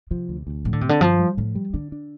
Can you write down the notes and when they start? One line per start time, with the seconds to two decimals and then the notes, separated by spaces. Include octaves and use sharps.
0.11 C3 F3
0.29 D2
0.47 D2
0.65 A2 F3
0.73 D3
0.81 C3 C4
0.89 D3
1.01 G2 F3
1.19 G3
1.37 A2 F3
1.55 G3
1.73 D3 D4
1.92 D4